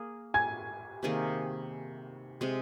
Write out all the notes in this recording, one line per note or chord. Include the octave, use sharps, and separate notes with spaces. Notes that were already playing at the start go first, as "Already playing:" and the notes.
Already playing: A#3 G#4
G#5 G#6
C3 D#3 A#3 G#4
C3 G#3 C4